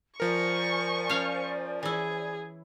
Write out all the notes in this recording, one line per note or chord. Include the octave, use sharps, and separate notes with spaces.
F3 A#4 C5 D5 G#5 C#6
C#4 F5
E3 E4 G#4